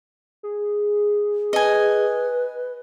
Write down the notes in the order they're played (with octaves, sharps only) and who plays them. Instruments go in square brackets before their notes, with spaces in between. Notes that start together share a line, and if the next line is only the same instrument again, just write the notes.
[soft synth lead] G#4
[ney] B4 [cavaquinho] D#5 G#5